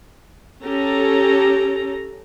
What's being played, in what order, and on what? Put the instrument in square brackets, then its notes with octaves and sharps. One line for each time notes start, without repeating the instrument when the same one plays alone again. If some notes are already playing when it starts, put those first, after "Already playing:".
[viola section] C#4 G4 A4 A#5